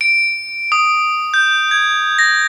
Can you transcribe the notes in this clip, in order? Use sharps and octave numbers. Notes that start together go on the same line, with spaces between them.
D7
D#6
G6
G#6
A#6